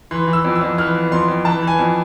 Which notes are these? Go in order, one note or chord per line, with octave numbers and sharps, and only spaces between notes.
E3 C6
E3
E6
F2
E6
F2
E3 F6
E3
F2 C6
F2
E3 A5
E3
G#5
F2